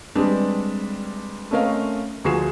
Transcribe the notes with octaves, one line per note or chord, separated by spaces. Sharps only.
G3 G#3 C4 D4 B4
A3 C4 C#4 A#4 D#5 F5
D2 F3 F#4 G#4 C7 E7